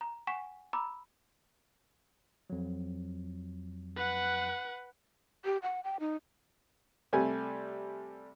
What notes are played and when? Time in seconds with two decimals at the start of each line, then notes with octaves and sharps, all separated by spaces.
0.01 A#5
0.27 F#5 G#5 C#6 B6 E7
0.73 A#5 B5 D6 E6
2.50 F2 F#3
3.96 B4 F#5
5.45 G4
5.63 F#5
5.84 G5
6.00 D#4
7.13 C3 G3 A3 G#5